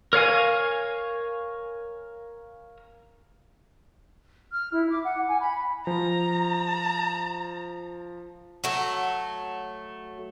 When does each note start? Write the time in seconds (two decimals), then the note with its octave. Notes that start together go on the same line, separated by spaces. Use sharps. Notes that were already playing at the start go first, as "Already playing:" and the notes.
0.13 A#4 C#5 F5 G#5
4.51 F6
4.72 E4
4.89 D6
5.03 F#5
5.27 G#5
5.40 B5
5.87 F3 A#5
8.64 F#3 A3